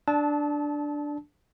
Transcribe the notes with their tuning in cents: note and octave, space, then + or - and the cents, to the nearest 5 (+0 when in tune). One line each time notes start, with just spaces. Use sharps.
D4 +0 A5 -20 E6 -45